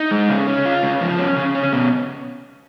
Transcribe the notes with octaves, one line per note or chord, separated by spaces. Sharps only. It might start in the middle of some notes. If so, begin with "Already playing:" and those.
Already playing: D#4
G#3
C#3
C#4
F4
C#3
F3
C#4
C#3
C#4
B2